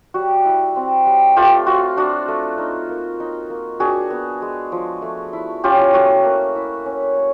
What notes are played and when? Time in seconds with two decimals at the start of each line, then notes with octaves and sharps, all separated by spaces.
0.14 G3 F#4
0.45 E4
0.76 C4
1.06 G3
1.36 A3 F4 G4
1.66 F4 F#4
1.97 D4 F#4
2.28 A3
2.58 D#4
2.89 A#3
3.20 D#4
3.50 A#3
3.80 D4 F#4 G#4
4.10 B3
4.42 G#3
4.72 F3
5.02 A3
5.33 E4
5.64 C#4 F4 G4
5.94 A3 F#4
6.24 A#3
6.56 E4
6.86 C#4
7.16 A#3